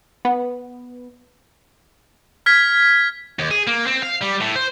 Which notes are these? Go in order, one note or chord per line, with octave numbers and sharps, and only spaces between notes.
B3
F6 G#6 B6
D#2
G#4
A#3
C4
F5
G3
A2
C5